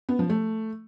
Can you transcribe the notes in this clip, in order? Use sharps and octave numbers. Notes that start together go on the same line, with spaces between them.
B3
F3
A3